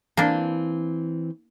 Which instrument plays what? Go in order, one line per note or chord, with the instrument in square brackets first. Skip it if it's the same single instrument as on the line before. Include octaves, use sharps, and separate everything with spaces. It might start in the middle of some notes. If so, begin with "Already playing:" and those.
[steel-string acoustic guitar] E3 C4 [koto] A#3 D4